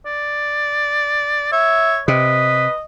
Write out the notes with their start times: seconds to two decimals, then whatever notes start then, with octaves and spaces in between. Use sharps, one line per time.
0.05 D5
1.52 C#5 E5
2.08 C3 B4 D#5